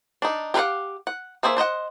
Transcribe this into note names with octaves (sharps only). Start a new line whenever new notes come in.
D4 D#4
G4 A#4 B4 F5 F#5
F#5
A#3 G#4 C5 C#5 E5
D4 C5 D#5 F#5